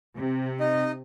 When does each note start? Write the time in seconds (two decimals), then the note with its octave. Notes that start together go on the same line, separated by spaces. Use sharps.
0.16 C3
0.60 D#4 D#5